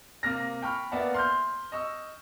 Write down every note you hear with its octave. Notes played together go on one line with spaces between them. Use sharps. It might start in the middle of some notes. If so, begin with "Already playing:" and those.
C3 A#3 F6 A#6
G5 B5 C#6 F6
A#3 B3 D5 E5 F#5
C6 F6 G6
D#5 C#6 E6